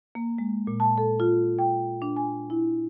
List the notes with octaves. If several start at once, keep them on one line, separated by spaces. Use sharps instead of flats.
A#3
G#3
A#2
A5
A4
F4
G5
D4
G#5
E4